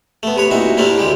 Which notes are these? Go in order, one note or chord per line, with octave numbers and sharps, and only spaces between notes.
A3 B3
C3 B4 C#5
C2 A#2 D#4 F#4 E5
G3 A3 A#3 C4 D4 E4
D2 G3 G#3 G4